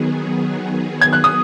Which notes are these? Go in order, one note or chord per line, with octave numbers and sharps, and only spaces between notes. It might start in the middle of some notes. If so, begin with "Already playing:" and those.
Already playing: D#3 F#3 B3 G#4
G#6
F#6
D#6